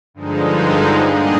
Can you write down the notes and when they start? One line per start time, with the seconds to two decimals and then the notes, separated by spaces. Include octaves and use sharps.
0.14 G2 D3 F3 G#3 D#4
1.06 A#2 G3 D4 G#4 D#5